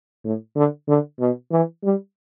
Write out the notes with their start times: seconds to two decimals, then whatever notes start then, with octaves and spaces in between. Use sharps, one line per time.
0.25 A2
0.56 D3
0.88 D3
1.20 B2
1.51 E3
1.83 G3